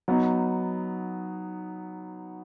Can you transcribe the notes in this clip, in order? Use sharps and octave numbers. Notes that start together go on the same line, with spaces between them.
F#3 B3 D#4